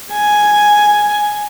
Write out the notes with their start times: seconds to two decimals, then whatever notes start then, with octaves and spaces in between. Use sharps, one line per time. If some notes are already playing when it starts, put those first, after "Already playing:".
0.12 G#5